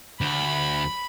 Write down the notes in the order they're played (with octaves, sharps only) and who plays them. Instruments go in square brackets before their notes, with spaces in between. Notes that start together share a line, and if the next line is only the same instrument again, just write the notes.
[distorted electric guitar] D2 [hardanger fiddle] B5